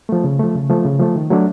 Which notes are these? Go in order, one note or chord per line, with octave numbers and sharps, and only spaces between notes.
F3 A3
C#3
F3 A3
C#3
F3 A3
C#3
F3 A3
D#3
F#3 A3 D4